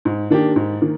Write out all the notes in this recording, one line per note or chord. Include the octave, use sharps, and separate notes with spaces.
G#2
D#3 A#3 D4 G4
G#2
D#3 A#3